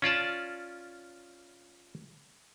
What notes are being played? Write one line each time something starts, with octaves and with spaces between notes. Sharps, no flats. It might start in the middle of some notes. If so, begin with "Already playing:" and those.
C#4 F4 D5 A5